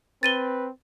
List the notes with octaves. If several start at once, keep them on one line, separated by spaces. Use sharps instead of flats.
C4 B4 A6 D#7 G7